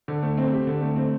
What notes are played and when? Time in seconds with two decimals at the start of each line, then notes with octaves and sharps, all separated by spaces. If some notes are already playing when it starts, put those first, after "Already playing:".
0.08 D3
0.23 A3
0.37 C4
0.53 G4
0.67 D3
0.82 A3
0.96 C4